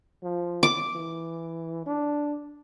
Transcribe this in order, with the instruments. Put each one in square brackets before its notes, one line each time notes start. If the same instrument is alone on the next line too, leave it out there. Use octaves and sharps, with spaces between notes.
[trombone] F3
[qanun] D6
[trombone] E3
D4